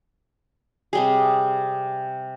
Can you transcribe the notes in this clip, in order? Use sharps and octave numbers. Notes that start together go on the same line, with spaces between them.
C3 G3 G#4